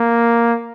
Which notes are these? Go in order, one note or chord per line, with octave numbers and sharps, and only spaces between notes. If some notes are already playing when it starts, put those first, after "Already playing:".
Already playing: A#3